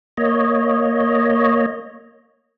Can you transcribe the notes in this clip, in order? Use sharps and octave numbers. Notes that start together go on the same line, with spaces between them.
A#3 C#5 D#5